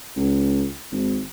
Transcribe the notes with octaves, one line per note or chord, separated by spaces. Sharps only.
C#2
G#1